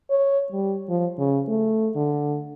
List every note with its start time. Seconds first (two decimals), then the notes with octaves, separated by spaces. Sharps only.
0.10 C#5
0.53 G3
0.89 F3
1.18 C#3
1.48 A3
1.96 D3